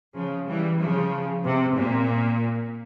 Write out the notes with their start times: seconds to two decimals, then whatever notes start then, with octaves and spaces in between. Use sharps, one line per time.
0.15 C#3 F3
0.47 E3 G3
0.80 C#3 F3
1.44 C3
1.77 A#2